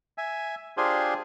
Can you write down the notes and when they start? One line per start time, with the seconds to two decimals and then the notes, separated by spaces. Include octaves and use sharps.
0.18 E5 G#5
0.77 D4 F4 G4 G#4 C5 G#5